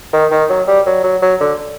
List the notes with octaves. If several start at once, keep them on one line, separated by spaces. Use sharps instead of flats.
D#3
D#3
F#3
G3
F#3
F#3
F#3
D3